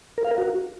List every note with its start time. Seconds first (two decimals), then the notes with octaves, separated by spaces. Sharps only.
0.18 A#4
0.25 F5
0.31 A#4
0.38 F#4